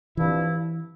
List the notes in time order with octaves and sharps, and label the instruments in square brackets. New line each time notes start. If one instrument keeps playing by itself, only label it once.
[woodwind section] G2 F3 C4 E4 [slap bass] E3